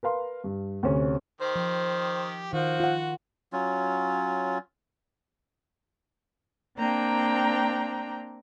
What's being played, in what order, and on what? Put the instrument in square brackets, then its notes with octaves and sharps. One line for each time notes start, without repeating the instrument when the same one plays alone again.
[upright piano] A#4 B4 F5 C6
G2
D2 C3 C#4
[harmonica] D#3 G4 [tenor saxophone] C5
[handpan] F3
[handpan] D#3 [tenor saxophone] F3 [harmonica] F#4
[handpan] F4 F#5
[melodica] F#3 C#4 F4
[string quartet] A#3 C4 D4 G5 A#5